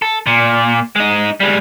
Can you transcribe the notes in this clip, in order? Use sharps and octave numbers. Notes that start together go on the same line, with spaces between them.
A4
A#2
G#3 D#4
G3 G#3